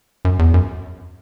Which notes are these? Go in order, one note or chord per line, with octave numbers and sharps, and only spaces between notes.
F#2
E2
F#2